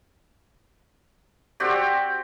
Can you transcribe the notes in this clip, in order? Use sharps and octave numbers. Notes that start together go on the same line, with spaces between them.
C4 F#4 G4 D5